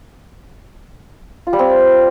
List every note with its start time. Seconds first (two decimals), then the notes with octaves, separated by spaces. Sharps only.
1.47 F4
1.53 G3
1.59 C4